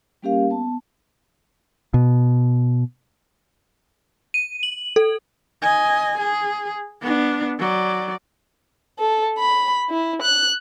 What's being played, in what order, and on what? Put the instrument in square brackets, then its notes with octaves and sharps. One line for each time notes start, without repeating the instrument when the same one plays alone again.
[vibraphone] G3 A#3 C#4 G4 A#4 F5
B3 A5
[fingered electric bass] B2
[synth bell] D#7
F#7
A4
[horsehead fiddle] D#5 G#5
G#4
B3 D4
F#3 D5
[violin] A4
B5
E4
F#6